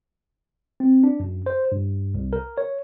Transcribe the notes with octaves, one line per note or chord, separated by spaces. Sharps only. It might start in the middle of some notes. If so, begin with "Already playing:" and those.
C4
D4
F#2
C5
G2
C2
A#4
C#5